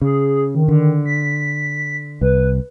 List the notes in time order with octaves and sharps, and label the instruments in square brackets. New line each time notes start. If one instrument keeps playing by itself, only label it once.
[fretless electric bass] C#3 [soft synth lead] G#4
[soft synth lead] D#3
[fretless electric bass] D3
[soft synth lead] B6
[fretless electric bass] C2 [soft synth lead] B4